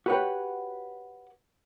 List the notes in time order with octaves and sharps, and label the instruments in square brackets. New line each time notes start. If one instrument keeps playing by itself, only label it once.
[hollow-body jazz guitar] F#4 G4 B4 C#5 F#5